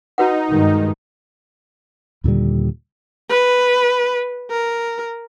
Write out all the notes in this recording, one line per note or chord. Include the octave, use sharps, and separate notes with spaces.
D#4 F#4 B4 F#5
G2 D#3 G#3
D#2 A#2 D3 G3
B4
A#4